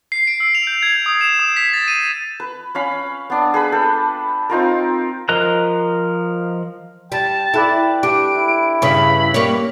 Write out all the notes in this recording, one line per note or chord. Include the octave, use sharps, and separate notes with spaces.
C7
D7
E6
F7
G6
G#6
D#6
E7
D#6
B6
A6
D#7
B4
C#4 F5 B5
B3 D4
G#4 B4 B5
A4 G5
C4 D#4 F4 A#4
F3 A#4 D#5 A#5 F#6
G3 G5 A5
E4 A4 B4 D5
D4 G4 D7
E4
G2 C#3 C#4 B5
G3 A#3 G4 C#5